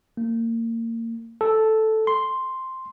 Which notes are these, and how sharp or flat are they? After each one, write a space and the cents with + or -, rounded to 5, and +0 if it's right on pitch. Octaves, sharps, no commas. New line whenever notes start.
A#3 -30
A4 -5
C6 +0